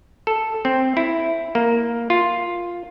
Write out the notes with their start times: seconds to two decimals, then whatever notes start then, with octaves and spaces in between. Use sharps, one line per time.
0.27 A4
0.65 C4
0.97 E4
1.55 A#3
2.10 F4